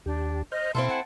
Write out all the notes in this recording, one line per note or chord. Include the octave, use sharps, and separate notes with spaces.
D#2 D4 G4
C5 D#5 F6 G6
B2 C4 E4 A4 F5 C6
F#5 G#5